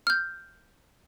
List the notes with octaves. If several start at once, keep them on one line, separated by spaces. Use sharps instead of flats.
F6 G6